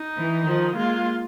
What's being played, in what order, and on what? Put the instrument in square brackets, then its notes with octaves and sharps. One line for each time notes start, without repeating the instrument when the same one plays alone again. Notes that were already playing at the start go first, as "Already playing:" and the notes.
Already playing: [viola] D#4
[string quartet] E3
D#3 F3
[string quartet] G#3 A#3 [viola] F4